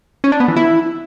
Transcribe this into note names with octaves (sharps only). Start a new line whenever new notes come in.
C#4
D4
B3
E3
E4